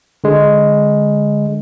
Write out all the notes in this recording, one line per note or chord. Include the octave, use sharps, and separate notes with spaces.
D3 G#3